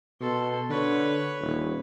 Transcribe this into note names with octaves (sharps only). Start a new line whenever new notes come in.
B2 A4 C6
D3 B4 C#5
D#1